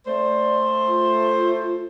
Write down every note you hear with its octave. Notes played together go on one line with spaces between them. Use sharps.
A3 C5 D5
F4